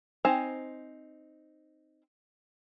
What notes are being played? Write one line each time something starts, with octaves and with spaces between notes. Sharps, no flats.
C4 D#4 C5 G#5 A#5